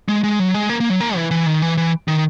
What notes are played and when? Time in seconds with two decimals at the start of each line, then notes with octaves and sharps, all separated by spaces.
0.09 G#3
0.24 G#3
0.39 F#3
0.54 G#3
0.69 A#3
0.80 A#3
0.90 F#3
1.00 A#3
1.16 E3
1.31 E3
1.46 D#3
1.62 E3
1.77 E3
2.08 D#3